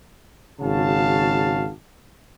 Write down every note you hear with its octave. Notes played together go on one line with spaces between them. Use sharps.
G#1 C#3 F#4 F5 A5